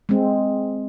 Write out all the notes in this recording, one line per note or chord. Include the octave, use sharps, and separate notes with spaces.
G#3 C4